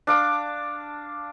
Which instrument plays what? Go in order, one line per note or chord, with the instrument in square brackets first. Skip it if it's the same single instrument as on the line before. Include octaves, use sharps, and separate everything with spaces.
[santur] D4 F5 D6